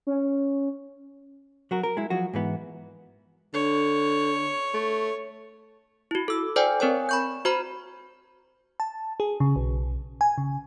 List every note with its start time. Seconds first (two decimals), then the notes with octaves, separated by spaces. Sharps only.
0.07 C#4
1.71 F#3 F#4 A#4
1.83 A#4
1.97 G#3 E4
2.10 F3 F#3 F#4
2.34 G#2 E3 B3
3.54 D3 C#5
4.74 A3
6.11 E4 F#4
6.28 A4 E6
6.56 A4 C5 D5 G5 G#5
6.80 C4 A#4 C#5 G#5
7.09 B5 C#6 G6
7.45 F#4 C5 A#5 B5
8.80 A5
9.20 G#4
9.40 C#3
9.56 B1
10.21 G#5
10.38 C#3